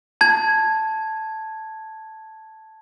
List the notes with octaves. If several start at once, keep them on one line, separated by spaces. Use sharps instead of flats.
A5 G#6